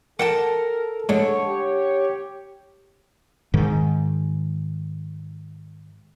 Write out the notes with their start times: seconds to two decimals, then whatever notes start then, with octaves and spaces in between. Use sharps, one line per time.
0.19 A4 A#4 F#5 G5 A5 D6
1.09 G#2 D3 A4 C#5
1.47 G4
3.54 G#2 D#3